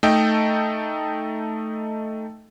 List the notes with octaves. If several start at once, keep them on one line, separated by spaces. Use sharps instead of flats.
A3 D#4 A4 D#5 G5